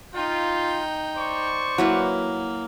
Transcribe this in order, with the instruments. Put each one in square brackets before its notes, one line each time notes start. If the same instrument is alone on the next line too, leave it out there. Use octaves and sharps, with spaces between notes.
[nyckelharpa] D#4 G5 [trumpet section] F4
[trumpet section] C5 D5 C#6
[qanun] F#3 E4 B4 [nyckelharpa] A#3